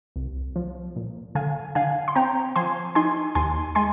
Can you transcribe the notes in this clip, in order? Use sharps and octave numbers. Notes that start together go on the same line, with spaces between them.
C2
F3
A#2
D3 F5 G#5
D3 F5 G#5
C6
C4 G5 A#5
F3 G#5 C6
D#4 G#5 C6
D#2 G#5 C6
G#3 G#5 C6